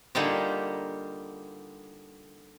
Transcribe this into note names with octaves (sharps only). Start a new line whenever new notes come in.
D3 G3 A#3 D#4 F4 G4